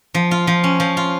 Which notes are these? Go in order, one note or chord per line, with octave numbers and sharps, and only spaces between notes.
F3
F4
F3
C#4
F3
F4